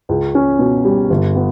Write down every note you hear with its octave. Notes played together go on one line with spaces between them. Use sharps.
C#2
C#4
B2
G3
G1
B3